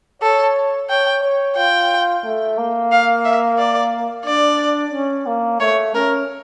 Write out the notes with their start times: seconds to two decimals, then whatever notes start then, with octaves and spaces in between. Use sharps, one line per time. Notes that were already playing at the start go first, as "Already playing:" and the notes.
0.22 A4 C#5
0.89 C#5 G5
1.23 C#5
1.57 F4 G5
2.25 A3
2.58 A#3
2.91 F5
3.25 E5
3.58 D5
4.25 D4 D5
4.93 C#4
5.26 A#3
5.60 A3 C#5
5.94 C#4 A#4